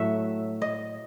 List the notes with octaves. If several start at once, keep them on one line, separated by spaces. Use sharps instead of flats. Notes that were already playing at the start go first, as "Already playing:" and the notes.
Already playing: A2 F#3 A3 E5 F#5
D#5